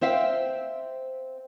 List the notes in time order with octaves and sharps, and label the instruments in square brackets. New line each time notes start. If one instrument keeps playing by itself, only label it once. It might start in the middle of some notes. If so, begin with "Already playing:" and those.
[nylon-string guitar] C4 C5 E5 F5 G5